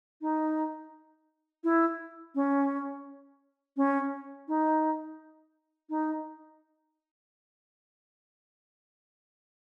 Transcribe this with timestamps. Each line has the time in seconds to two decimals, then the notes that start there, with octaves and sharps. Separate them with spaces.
0.21 D#4
1.64 E4
2.35 C#4
3.77 C#4
4.48 D#4
5.90 D#4